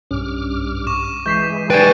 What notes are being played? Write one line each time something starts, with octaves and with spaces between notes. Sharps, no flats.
B1 G2 C#4 D6 F6
C#6 D6 E7
E3 G#3 C#6 G6 B6 C7
B4 D5 G5 G#5 C#6 A6 D7 D#7